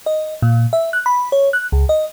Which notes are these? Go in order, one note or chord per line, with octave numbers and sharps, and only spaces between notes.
D#5
A#2
E5
F#6
B5
C#5
F#6
C#2
D#5